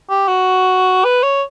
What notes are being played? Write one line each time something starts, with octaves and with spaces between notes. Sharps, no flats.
G4
F#4
B4
C#5